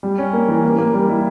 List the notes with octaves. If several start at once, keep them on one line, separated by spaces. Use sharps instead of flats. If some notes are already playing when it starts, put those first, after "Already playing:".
G3
C#4
A#3
E3
A#3
A#3
G3
E4